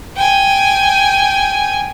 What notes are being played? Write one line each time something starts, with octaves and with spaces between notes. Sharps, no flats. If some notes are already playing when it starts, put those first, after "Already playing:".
G5 G#5